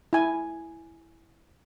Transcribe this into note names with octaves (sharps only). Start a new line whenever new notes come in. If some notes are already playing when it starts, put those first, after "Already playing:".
E4 G#5